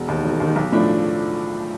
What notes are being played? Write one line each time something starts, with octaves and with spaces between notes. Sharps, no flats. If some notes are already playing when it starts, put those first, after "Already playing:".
Already playing: E1
D#2 D#3
E1
D#2 D#3
B1
A2 F3 A3 D4